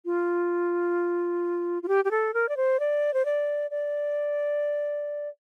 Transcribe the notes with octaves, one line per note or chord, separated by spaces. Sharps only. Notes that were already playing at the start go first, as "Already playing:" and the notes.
F4
F4
G4
G4
A4
A#4
D5
C5
D5
C5
D5
D5